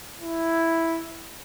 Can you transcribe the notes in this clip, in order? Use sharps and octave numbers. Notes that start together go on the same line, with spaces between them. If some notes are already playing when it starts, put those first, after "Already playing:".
E4